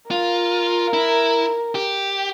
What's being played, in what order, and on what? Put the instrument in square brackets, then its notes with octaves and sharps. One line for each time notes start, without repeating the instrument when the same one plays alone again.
[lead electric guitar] F4 [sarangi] A#4
[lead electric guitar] E4
G4